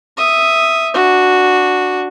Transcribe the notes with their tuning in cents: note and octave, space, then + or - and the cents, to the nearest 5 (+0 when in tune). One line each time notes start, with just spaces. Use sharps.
E5 +0 D#6 +0
D4 +0 F#4 -5